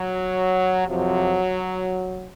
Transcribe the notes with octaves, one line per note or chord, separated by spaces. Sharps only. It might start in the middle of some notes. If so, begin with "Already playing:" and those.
Already playing: F#3
F2 C3 F3 F#3